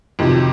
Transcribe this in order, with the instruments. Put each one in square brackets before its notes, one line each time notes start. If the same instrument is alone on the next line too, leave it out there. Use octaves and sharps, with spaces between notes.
[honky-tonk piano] F2 C3 D#3 F#3